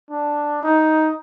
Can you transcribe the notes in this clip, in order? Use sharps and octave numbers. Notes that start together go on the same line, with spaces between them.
D4
D#4